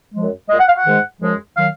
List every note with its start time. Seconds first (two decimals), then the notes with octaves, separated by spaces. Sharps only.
0.14 F#2 F3 G#3
0.49 A#2 G#3 D#5
0.59 F#5
0.67 F5
0.77 F#5
0.85 G#2 D#3 G#3
1.21 F#2 F3 G#3
1.56 D#3 F#3 F5